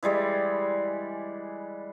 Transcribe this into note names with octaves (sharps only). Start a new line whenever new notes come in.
E3 G3 G#3 D5